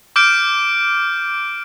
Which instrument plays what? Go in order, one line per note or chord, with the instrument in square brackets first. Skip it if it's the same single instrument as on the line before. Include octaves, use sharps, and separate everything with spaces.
[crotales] D6 F6 G6 D7